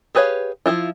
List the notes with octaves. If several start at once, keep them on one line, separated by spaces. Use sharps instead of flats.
G4 G#4 B4 C#5 F5
F3 F#3 E4 F4